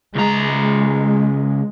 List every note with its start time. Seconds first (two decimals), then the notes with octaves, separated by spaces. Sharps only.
0.15 C#2 G#3 A#5